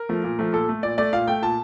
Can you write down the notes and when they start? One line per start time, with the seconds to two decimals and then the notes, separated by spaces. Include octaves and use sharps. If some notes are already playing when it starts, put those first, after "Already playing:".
Already playing: A#4
0.09 F3 A3
0.24 A#2
0.39 F3 A3
0.53 A#2 A4
0.69 A3
0.83 A#2 D5
0.98 A3 D5
1.13 A#2 F5
1.27 A3 G5
1.42 A#2 A5